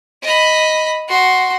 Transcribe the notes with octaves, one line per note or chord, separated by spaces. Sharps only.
D#5 B5
F#4 C6